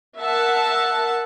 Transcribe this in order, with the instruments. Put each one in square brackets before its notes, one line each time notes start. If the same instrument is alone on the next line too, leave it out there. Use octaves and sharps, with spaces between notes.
[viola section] A#4 E5 F#5 A5